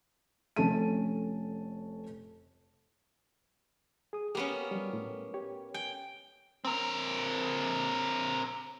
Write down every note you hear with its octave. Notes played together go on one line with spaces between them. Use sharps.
F1 C#4 A4 A5 D#7
G#4 D#6
A#3 B3 C#4 G4 B4
F#3 G3
A2
G4 C#5
G5 G#5
C4 A#4